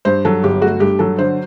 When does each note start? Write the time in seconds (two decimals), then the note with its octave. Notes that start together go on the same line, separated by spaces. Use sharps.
0.05 G2 C5
0.25 F#3 A4
0.44 G1 G4
0.61 A3 F#4
0.80 G2 G4
0.99 F#3 A4
1.18 D3 C5